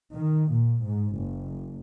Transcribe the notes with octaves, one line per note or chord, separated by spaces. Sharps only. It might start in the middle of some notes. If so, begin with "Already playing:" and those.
D#3
A#2
G#2
F#1